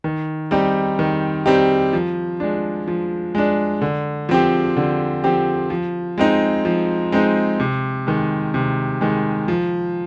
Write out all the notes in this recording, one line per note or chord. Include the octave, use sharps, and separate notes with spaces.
D#3
G3 C4 D#4 G4
D#3
G3 C4 D#4 G4
F3
G#3 D4
F3
G#3 D4
D3
F3 C4 G4
D3
F3 C4 G4
F3
G#3 C4 D#4
F3
G#3 C4 D#4
C3
D#3 G#3
C3
D#3 G#3
F3